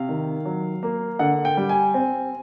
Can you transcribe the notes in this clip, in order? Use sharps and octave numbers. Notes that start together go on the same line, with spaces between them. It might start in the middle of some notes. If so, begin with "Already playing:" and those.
Already playing: C3 F5
D#3
F#3
A#3
D3 F#5
G5
G3
G#5
C4